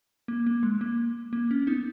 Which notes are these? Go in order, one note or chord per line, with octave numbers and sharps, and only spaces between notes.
A#3
A#3
G#3
A#3
A#3
C#4
B3 D#4